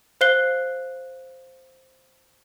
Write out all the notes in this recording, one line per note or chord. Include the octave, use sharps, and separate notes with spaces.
C5 F5 F#6 C7 G7